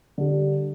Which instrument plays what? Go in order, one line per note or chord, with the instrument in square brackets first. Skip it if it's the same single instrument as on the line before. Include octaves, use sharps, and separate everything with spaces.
[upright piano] D3 G3